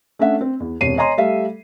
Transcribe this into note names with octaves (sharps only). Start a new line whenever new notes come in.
A3 C#4 D4 E5 F#5
C4
E2
E1 C3 C#5 C7 D#7
C#5 D#5 G#5 A#5 C6
G3 A3 A4 E5 F5